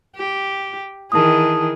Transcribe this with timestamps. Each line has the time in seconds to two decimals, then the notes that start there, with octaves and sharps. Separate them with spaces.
0.16 G4
1.12 D#3 E3 G#4 A5 D#6